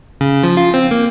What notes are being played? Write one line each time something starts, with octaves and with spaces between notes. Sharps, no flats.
C#3
F3
F4
C4
A#3